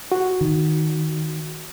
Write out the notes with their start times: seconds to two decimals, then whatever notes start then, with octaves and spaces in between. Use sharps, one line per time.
0.12 F#4
0.41 D#3